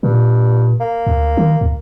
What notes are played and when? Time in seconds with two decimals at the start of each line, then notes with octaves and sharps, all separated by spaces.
0.03 G2 A#2
0.80 A#3
1.07 D2
1.37 D#3
1.61 D2